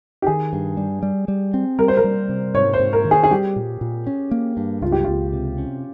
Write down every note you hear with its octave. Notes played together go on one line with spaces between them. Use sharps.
G4
D#3 G#4
G2
G3
G3
G3
C4
G3 A#4
C5
A#4
G3
C3
G#2 C#5
C5
G#2
A#4
D#3
G#4
G#4
G3 G4
A#2
A#2
C#4
A#3
G2
C#2 F4
G4
C#2 F4
C3
C#4